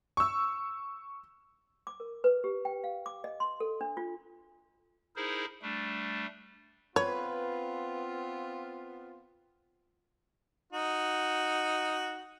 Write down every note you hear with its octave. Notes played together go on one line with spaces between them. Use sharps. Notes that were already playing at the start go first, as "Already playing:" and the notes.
C#6 E6
D6
A#4
B4
G4
G5
F5
D6
D#5
C6
A4
D4
F4
D#4 E4 G#4 A#4 C5
G3 A3 D4
B3 C4 F4 B4 C#5
D#4 F#4